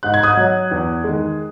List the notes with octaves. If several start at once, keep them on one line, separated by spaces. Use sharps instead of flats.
G#2 F#6
G#6
D#6 F#6
F#3
E2
G#3
D#3